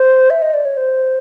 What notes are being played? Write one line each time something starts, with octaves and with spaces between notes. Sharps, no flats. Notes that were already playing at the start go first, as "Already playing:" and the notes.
Already playing: C5
E5
D#5
D5
C#5
C5